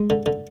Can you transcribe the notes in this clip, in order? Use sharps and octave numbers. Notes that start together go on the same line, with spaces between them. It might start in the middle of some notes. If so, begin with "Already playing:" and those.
Already playing: G#3
D3
D3